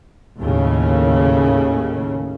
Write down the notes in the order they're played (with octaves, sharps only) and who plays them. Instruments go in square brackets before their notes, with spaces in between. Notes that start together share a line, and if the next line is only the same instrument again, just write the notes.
[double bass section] D#2 A2 C#3